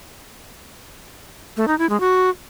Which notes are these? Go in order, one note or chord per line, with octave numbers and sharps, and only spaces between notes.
A3
D#4
E4
G#3
F#4